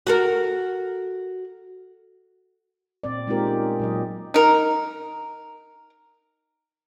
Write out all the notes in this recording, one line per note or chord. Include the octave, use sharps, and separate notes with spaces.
F#4 A4 A#4
A#2 C4 D5
G#3 C4 D#4 F4 G4 A#4
C#4
A#2 F#3 D#5
D#4 A#4